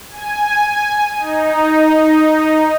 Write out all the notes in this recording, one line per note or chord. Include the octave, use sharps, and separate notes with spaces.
G#5
D#4